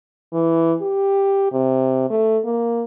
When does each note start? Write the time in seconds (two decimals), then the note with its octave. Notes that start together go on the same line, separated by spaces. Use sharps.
0.33 E3
0.82 G4
1.52 C3
2.10 A3
2.45 A#3